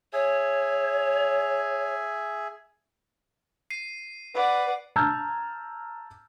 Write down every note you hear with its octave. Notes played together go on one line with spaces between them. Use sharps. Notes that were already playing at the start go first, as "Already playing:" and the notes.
G#4 C#5 E5 G#5
C7 D#7
B4 D5 F#5
A5 A#5 E6 F6 G6 G#6